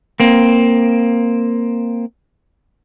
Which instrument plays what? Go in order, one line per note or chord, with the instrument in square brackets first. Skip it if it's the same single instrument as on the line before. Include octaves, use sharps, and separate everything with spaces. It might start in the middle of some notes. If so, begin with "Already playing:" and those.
[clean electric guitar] A#3 C4